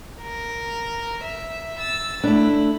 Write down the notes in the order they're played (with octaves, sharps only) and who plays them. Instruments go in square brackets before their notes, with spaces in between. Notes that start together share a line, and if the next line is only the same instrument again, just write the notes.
[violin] A#4
E5
E6 A6
[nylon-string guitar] A3 D4 [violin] E4